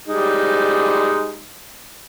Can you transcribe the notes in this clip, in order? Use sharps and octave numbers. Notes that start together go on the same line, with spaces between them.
G3 G#3 D#4